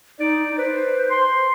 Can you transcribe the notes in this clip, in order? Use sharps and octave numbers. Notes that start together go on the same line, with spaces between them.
D#4 D5
B4 C5
C6